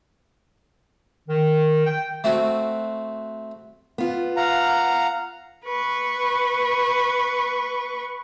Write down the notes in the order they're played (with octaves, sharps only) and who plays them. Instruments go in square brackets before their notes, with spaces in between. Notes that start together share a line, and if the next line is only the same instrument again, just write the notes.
[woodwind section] D#3
G5
[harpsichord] A3 C4 F#4
[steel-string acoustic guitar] B3 F4
[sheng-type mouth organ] F5 F#5 A#5
[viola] B4 C#6